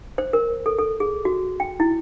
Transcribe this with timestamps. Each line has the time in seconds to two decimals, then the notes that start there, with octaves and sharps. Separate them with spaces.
0.18 C5
0.33 A#4
0.66 A4
0.79 A4
1.00 G#4
1.25 F#4
1.60 G5
1.80 E4